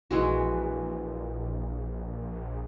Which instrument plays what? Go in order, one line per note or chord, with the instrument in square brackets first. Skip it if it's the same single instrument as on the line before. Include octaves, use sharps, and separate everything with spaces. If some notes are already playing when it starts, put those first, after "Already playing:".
[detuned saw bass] A#1 [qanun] E3 G#3 F#4